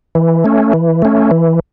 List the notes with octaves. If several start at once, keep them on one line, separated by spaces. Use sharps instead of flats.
E3
A3 C#4
E3
A3 C#4
E3